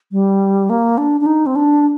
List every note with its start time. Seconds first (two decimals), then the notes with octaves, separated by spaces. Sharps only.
0.12 G3
0.70 A#3
0.98 D4
1.21 D4
1.26 D#4
1.46 C4
1.56 D4